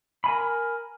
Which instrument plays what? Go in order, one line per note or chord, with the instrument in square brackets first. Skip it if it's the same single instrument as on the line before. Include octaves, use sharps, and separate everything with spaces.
[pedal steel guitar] A#4 G#5 B5